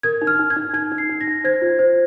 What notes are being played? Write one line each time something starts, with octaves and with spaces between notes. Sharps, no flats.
A#4 G#6
D#4
F6
D#4
G#6
D#4
D#4 G#6
D#4
C7
D#4
A#6
D#4
C5 G#6
F4
C5